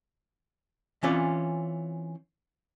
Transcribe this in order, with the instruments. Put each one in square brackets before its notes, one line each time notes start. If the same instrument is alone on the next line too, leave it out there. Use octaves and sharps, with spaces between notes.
[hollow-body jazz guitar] E3 C4 C#4 F4 D5